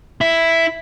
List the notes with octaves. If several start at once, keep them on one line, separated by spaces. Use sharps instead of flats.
E4